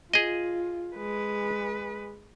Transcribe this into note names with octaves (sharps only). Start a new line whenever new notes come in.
F4 G#4 D#5
G#3 B4